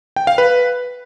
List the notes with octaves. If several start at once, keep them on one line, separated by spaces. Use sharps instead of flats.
G5
F5
B4